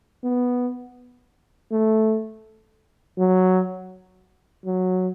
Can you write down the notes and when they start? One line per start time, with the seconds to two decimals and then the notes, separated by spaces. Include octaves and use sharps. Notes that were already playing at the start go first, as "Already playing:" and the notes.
0.24 B3
1.72 A3
3.19 F#3
4.66 F#3